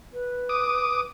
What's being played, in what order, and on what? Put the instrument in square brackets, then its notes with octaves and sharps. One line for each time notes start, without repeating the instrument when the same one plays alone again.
[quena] B4
[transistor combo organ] D6 D#6